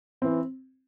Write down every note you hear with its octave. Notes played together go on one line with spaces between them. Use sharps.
E3 C4